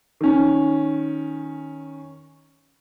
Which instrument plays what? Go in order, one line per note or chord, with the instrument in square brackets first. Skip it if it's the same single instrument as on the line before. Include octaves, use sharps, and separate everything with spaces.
[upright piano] D#3 C#4